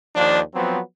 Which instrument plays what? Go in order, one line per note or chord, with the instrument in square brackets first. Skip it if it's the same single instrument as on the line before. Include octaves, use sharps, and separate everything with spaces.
[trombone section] D#2 F3 D4
F3 F#3 B3 C4